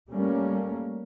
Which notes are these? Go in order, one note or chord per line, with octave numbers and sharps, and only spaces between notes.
G3 A3 A#3 C#4